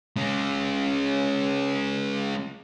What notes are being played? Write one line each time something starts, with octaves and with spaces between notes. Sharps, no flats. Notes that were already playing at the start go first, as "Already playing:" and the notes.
G#3 C#4